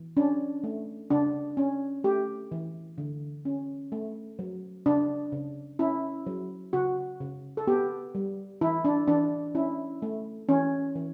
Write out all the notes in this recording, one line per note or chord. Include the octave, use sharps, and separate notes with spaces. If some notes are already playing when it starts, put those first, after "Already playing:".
Already playing: E3
C#4 D4
A3
C#3 D4
C#4
A3 G4
E3
D3
C#4
A3
F#3
C#3 D4
C#3
C#4 E4
F#3
C#3 F#4
C#3
A4
B3 G4
G3
E3 E4
D4
E3 D4
C#4 E4
A3
E3 C#4
E3